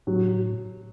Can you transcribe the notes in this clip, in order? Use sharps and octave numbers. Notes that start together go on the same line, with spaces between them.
A2 F#3